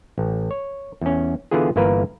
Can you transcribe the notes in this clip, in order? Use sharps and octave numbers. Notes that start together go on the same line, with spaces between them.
A1
C#5
E2 C#4
D3 E3 B3 F4 G#4
G1 E3 A#3 A#4 B4